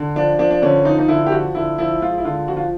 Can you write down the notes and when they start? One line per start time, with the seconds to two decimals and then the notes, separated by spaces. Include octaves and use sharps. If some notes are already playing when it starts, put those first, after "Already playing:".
Already playing: D3
0.16 F3 D4
0.39 F3 D4
0.51 D4
0.62 D3 C#4
0.85 F3 D#4
0.99 D#4
1.08 D3 E4
1.26 G4
1.32 F3 F#4
1.55 D3 E4
1.78 F3 E4
2.02 G#3 F4
2.18 E4
2.25 D3 F4
2.48 F3 F#4
2.57 F4